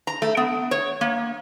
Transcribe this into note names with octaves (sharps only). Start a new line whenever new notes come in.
A#5
A3
B3
C#5
A#3